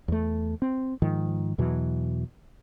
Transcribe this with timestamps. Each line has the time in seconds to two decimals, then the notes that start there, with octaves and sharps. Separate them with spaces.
0.08 E2 A3
0.62 C4
1.02 G#2 D#3 F3
1.58 E2 B2 E3 F#3